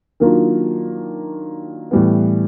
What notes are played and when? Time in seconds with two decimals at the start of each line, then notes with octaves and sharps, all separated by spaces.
0.20 D#3 F#3 A#3 D4 F4
1.91 A2 E3 G3 B3